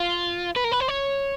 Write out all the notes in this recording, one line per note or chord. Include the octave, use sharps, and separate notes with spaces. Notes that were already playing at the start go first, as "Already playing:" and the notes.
Already playing: F4
B4
A#4
B4
C5
C#5